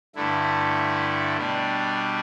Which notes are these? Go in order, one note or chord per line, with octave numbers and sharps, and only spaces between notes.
G2 D3 A3 E4
B2 G3 D4